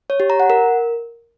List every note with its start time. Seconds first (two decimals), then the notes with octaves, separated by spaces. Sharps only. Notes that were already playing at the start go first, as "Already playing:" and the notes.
0.10 C#5
0.20 G4
0.30 A#5
0.40 F#5
0.50 A#4